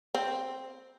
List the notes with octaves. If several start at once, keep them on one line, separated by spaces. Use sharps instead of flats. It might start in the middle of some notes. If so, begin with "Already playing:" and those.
C4